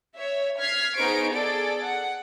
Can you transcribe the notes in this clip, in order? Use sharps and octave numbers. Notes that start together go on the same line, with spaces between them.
C#5 E5
F6 G#6 B6 C7
B3 D#4 G#4 C5 C#6 D7
G#4 A4 D5 A6 D7
F#5